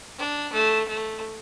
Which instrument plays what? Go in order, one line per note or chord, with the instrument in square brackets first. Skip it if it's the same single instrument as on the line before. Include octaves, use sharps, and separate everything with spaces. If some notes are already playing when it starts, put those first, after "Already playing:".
[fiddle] D4
A3
A3